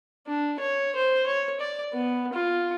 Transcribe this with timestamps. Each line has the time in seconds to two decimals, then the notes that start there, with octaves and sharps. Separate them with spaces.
0.27 D4
0.60 C#5
0.95 C5
1.26 C#5
1.60 D5
1.93 B3
2.33 F4